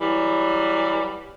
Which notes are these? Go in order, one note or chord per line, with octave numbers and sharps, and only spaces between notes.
E3 F#3 G3